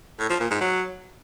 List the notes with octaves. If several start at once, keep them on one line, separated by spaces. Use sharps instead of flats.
A2
F3
A#2
G#2
F#3